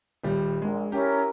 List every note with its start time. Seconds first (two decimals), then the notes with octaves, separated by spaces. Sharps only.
0.24 D#1 G3
0.62 A#1 G#3
0.92 C#4 E4 G4 A#4